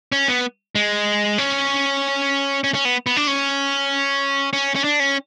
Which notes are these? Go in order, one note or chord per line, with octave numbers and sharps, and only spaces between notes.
C#4
B3
G#3
C#4
C#4
C#4
B3
B3
D4
C#4
C#4
C#4
D4
C#4